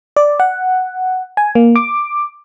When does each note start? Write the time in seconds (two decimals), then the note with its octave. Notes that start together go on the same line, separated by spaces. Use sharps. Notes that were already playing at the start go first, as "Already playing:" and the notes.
0.17 D5
0.40 F#5
1.37 G#5
1.55 A#3
1.76 D6